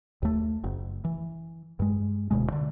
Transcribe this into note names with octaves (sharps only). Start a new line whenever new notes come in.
D#2 A3
F#1
E3
G2 G#3
E1 D2 B2 G#3
D3